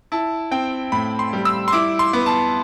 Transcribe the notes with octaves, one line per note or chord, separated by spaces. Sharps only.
E4 A5
C4 G5
A2 B5
C6
G3
E6
C6
E4 D6
C6
B3
A5